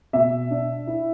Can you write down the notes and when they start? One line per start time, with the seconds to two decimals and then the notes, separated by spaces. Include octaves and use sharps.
0.13 B2 E5
0.51 D4
0.87 E4